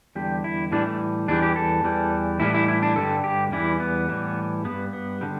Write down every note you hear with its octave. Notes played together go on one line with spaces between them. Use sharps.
E2 D3 G3 G4
E4
A2 E3 G3 D4
A3
E2 E3 G3 D4
G4
A4
E2 E3 G3
A2 E3 G3 E4
E4
E4
D4
G2 D3 G3 A4
G4
E2 E3 G3 E4
B3
A2 E3 G3
G2 G3 B3
B3
D3 G3